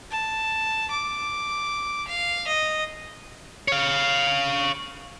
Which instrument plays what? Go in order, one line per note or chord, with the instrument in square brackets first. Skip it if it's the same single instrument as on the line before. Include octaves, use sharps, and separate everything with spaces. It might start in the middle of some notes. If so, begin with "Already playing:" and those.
[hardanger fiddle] A5
D6
F5
D#5
[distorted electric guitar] C#5 F5